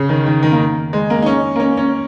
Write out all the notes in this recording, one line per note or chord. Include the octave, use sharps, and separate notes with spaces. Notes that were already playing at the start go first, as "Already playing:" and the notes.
Already playing: C#3
D#3
D#3
D#3
A#3
G#3
A#3
D#4
C#4
A#3
C#4
C#4